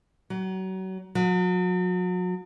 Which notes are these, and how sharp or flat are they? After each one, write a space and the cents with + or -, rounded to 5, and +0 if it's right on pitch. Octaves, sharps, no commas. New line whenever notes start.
F#3 +30
F#3 -35